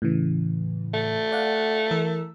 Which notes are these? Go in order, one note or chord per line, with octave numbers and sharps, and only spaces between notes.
A2 C#3 E3
A3
D5 F5 F#5
E3 A#4 E6